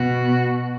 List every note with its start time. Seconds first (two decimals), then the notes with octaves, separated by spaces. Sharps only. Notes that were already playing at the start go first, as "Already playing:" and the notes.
Already playing: B2 F#4